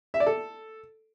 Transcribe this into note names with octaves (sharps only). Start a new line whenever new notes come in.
E5
D5
A4